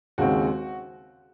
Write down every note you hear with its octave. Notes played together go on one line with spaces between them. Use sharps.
D#2 C#3 G#3 C4 F#4